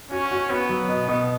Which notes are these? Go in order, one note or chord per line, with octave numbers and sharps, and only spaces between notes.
C#4 F#4
F#4
B3 F#4
F#3
B2
B2